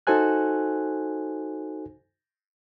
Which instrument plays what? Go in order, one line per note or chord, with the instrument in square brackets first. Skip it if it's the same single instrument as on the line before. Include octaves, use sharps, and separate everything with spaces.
[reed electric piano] D#4 F#4 A4 C5 G#5 F#6